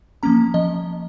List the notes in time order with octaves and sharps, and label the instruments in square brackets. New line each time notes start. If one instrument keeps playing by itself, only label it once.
[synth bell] F3 A#3 C#4 A#5
F3 D#5